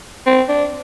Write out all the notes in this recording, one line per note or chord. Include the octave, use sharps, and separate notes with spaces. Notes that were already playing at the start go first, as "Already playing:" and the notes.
C4
D4